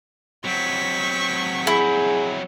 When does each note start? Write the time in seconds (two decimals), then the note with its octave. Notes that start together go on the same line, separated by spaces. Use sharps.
0.45 F#3 C4 C#6 B6
1.67 E4 G#4